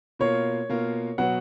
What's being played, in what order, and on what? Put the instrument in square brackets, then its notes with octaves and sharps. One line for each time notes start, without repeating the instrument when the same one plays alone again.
[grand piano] B2 A#3 F4 A#4 [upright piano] C#5
[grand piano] B2 A#3 F4 A#4
[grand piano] B2 F#3 B3 [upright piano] F#5